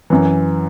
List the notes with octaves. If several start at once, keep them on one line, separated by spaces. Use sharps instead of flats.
F#2 E3